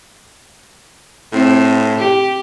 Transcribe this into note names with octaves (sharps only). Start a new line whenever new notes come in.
A2 C4
G4